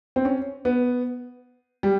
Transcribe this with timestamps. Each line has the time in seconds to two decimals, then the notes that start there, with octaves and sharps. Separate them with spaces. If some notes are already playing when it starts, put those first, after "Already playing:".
0.16 C4
0.25 C#4
0.65 B3
1.83 G3